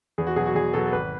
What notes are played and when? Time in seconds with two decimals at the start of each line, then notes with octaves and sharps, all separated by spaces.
0.18 E2 G#4
0.27 F#4
0.36 B2 F#3 G#4
0.46 F#4
0.55 E2 G#4
0.73 B2 F#3 A4
0.87 A4
0.92 G#1 B4